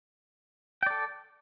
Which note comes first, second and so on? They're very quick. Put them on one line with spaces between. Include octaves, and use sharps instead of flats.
G5 D5 A4